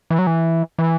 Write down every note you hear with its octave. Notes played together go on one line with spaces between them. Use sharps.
E3
F#3
E3
E3